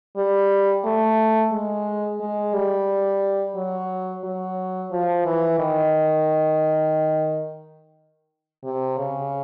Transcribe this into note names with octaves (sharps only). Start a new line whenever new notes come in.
G3
A3
G#3
G#3
G3
F#3
F#3
F3
E3
D#3
C3
C#3